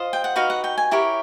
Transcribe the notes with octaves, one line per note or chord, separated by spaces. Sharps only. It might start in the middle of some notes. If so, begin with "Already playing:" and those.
Already playing: F4 C5 D#5
G5
F#5
D#4 F#4 B4 F5
F#5
G5
G#5
E4 G4 A#4 C#5